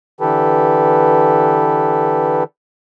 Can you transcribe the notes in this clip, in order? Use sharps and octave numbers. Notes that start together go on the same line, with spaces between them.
D3 E3 G4 A4 B4